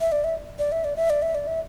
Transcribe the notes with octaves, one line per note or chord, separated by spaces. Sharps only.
E5
D5
E5
D5
E5
D5
E5
D5
E5
D5
E5